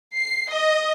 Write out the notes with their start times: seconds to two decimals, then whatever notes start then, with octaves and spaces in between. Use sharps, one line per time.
0.18 C7
0.52 D#5